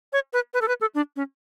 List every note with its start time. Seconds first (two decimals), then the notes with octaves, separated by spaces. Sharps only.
0.13 C#5
0.33 B4
0.54 B4
0.62 A4
0.68 B4
0.81 A4
0.95 D4
1.16 C#4